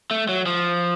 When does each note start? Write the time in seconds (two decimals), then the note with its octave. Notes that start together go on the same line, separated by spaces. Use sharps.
0.11 A3
0.29 F#3
0.46 F3